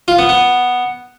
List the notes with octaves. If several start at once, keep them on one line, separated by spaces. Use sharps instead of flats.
F4
B3
B3